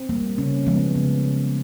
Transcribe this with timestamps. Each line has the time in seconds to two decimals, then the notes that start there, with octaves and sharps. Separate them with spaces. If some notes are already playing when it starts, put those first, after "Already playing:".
Already playing: C4
0.09 G3 A#3
0.38 C#3 C#4
0.67 F3 G#3 B3
0.95 C#3